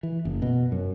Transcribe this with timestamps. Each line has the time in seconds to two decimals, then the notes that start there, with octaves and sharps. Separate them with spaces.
0.03 E3
0.25 F#1
0.42 B2
0.72 F#2